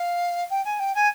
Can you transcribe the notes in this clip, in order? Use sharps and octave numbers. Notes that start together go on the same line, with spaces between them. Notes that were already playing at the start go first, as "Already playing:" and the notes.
Already playing: F5
G5
G#5
G5
G#5